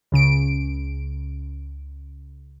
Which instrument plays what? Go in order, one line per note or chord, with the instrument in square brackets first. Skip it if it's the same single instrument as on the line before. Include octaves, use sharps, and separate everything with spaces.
[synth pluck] C#2 C#3 D7